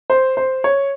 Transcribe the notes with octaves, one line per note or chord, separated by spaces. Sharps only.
C5
C5
C#5